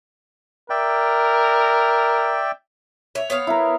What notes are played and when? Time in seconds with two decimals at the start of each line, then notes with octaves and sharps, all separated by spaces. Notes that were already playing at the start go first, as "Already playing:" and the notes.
0.70 A#4 D5 E5 G5
3.15 C#5 E5
3.30 B3 C#5 F5
3.47 E4 A#4